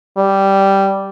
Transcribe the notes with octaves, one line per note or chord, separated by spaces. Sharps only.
G3